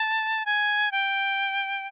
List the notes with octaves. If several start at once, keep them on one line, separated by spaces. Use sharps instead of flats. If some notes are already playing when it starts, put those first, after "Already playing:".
Already playing: A5
G#5
G5